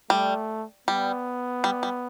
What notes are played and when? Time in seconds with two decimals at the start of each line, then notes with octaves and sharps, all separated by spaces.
0.10 G3 A3
0.87 G3 B3
1.64 G3
1.83 G3